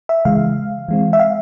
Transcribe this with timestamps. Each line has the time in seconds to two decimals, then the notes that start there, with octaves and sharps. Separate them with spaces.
0.09 E5
0.25 C#3 E3 G#3 F5
0.88 E3 G#3 C4
1.13 E5
1.20 F5